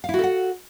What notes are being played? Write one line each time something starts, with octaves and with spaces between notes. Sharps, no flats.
E4 F#4 A4 F5 F#5